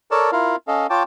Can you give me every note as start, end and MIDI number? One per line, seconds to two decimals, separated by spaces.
0.11 0.31 69
0.11 0.31 70
0.11 0.31 73
0.11 0.31 74
0.11 0.31 81
0.32 0.56 64
0.32 0.56 65
0.32 0.56 70
0.32 0.56 77
0.68 0.87 61
0.68 0.87 69
0.68 0.87 75
0.68 0.87 77
0.90 1.03 65
0.90 1.03 73
0.90 1.03 79
0.90 1.03 81
0.90 1.03 86